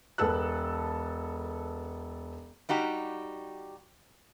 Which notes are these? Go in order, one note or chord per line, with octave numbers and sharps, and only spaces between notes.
E1 B3 A4 E6 F#6
G3 D#4 F#4 G4